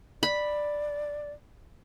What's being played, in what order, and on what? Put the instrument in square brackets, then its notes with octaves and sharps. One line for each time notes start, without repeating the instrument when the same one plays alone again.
[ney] D5 [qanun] B5